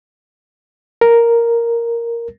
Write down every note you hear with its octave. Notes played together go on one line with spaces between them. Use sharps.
A#4